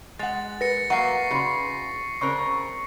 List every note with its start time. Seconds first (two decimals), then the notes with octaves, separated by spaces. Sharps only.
0.19 G#3 F#5 A6
0.61 A#4 B4 A#6 C#7
0.90 F#3 A#3 E5 F#5 C#6 C7
1.31 C#3 F#4 D5 C6
2.21 C#3 C4 A#4 C5 D5 C#6